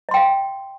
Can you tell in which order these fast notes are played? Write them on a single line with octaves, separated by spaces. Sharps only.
D#5 C6 G5 F5